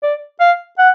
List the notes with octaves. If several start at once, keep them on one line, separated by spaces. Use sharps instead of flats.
D5
F5
F#5